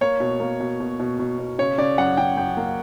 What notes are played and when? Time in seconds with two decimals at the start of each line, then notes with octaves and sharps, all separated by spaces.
0.01 A#3 C#5
0.20 B2
0.40 A#3
0.60 B2
0.80 B2
1.00 B2
1.19 B2
1.39 B2
1.58 C#3 C#5
1.78 C#3 D5
1.98 F#2 F#5
2.17 C#3 G5
2.37 F#2 G5
2.57 A#3